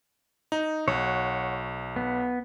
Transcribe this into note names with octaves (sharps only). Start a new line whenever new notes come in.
D#4
B1 C#5 F#5
B3